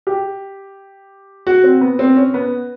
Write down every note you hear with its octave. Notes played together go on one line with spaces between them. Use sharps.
G4
F#4
C4
B3
C4
C#4
B3